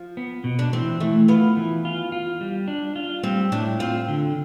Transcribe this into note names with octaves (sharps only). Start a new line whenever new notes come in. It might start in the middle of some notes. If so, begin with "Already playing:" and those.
Already playing: F3
B3
B2
D4
E3 C4
E3 A3
B3 F4
E3
F4
F4
G3
D4
F4
G3 C4
A2 D4
C4 F4
D3